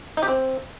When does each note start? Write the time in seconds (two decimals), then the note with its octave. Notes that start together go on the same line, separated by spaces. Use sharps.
0.17 D#4
0.23 G4
0.28 C4